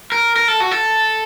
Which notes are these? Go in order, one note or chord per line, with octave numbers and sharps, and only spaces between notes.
A#4
A#4
A4
F#4
A4